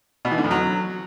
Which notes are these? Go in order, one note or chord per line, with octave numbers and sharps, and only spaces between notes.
B2
E3
D3
F2
F#3